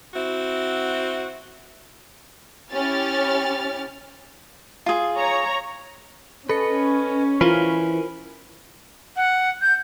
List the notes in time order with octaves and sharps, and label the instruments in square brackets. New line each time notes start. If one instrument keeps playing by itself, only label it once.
[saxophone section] C4 E4 F#4
[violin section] C#4 E4 G4 F6 A6
[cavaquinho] F4 G#4
[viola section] C#5 A#5
[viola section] C#4 [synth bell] A4 C#7 [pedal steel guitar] B4 D#5
[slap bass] E3 [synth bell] F4 A#4 C5 [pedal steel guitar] G#5 B5 F6
[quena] F#5
G6